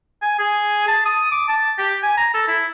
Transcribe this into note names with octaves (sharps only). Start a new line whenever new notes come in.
G#5
G#4
A5
D#6
D6
A5
G4
G#5
A#5
A4
E4